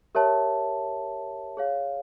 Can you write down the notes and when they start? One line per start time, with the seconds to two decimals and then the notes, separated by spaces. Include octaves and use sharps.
0.15 G4 A#4 C#5 E5 A5
1.57 G#4 C#5 F5